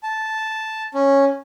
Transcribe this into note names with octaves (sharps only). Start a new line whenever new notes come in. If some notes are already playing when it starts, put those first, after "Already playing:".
A5
C#4